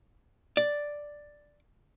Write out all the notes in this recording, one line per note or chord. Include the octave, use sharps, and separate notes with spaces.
D5